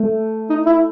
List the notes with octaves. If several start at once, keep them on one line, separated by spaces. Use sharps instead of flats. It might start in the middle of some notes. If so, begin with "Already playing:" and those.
Already playing: A3
D#4
E4